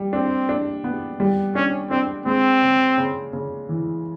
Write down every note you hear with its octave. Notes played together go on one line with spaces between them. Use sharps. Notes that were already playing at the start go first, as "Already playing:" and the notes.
Already playing: G3
C4 D4
D4
B3
G3
C#4 D4
C4 D4
G#3 C4
C#3
C#3
C#3
E3